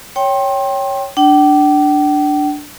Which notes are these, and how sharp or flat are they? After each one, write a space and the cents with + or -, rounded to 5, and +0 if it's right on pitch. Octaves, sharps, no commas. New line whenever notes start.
C#5 +0 G5 +0 C6 +30
D4 +0 G5 -40